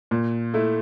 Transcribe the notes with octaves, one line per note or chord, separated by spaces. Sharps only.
A#2
A3 E4